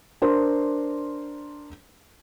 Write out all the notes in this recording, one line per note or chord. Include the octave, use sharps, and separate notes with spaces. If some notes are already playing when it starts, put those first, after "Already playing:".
D4 A#4 C5 C6